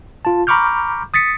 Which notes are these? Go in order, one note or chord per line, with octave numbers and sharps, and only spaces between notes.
F4 A5
A#5 B5 C#6 D6 F6 G6
D#6 A6 B6 C#7